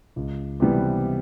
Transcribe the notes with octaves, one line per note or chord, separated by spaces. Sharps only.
C#2
C3 E3 G3 B3